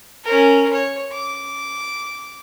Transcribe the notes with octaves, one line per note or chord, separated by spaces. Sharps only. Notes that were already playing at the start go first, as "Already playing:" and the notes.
C#4 A#4
C#5
D6